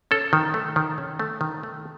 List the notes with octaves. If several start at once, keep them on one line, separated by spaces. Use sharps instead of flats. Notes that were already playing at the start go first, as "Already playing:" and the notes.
C#4 A4
D#3
A3
D#3
C#4
A3
D#3
A3